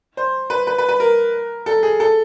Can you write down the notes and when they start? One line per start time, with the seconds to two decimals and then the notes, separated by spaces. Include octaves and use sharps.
0.17 C5
0.50 B4
0.67 B4
0.78 B4
0.89 B4
1.00 A#4
1.66 A4
1.83 G#4
2.00 A4